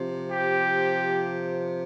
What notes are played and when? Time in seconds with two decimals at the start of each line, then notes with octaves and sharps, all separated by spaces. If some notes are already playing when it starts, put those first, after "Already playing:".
Already playing: C3 F3
0.31 G4